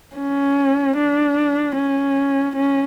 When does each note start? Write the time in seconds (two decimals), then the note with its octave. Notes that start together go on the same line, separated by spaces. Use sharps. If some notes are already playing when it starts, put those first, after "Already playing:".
0.16 C#4
0.97 D4
1.76 C#4
2.56 C#4